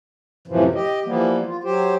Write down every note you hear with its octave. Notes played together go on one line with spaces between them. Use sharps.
F#2 A2 C3 E3 F3
G4 D#5
E3 F3 G3 A#3 B3
F4
F#3 G4 C5